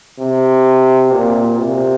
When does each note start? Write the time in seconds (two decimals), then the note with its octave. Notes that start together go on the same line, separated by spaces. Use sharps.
0.19 C3
1.13 A#2
1.60 C3